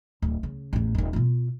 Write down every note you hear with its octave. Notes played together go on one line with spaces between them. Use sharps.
D1
C#3
A1 E2
D#1 D#2
B2 F4